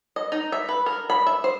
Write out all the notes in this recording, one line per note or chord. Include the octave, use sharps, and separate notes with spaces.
D#5
D#4
E5
B4
A#4
B5
E5
C5